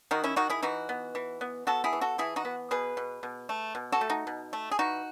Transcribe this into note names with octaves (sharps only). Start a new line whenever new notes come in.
D#3 D#4 F#4
C#4 E4
D#3 D#4 F#4
E4 G#4
E3 D#4 F#4
B3
E3
B3
B3 F#4 A4
E4 G#4
E3
F#4 A4
E3 E4 G#4
D#4 F#4
B3
B2 G#4 B4
B2
B2
A3
B2
F#4 A4
A3
D#4 F#4
B2
A3
G#4
E3 D#4 F#4